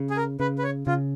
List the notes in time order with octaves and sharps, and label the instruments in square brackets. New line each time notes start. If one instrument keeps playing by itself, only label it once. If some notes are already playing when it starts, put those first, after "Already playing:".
Already playing: [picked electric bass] C#3
[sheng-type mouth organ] G#4
A#4
[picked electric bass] C#3 [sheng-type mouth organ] B4
[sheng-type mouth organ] B4
C#5
[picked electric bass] C#3 [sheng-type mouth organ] F4